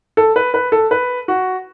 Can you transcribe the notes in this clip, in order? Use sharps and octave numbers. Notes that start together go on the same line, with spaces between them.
A4
B4
B4
A4
B4
F#4